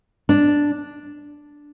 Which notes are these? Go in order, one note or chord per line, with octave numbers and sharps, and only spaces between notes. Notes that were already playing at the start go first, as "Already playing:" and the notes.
D4